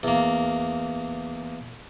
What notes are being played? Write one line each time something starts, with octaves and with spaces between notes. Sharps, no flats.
E2 A#3